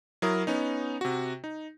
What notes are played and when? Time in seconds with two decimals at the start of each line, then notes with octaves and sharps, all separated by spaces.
0.22 F#3 E4 A#4 D#6
0.47 B3 C#4 D#4
1.01 C3 F#4
1.44 D#4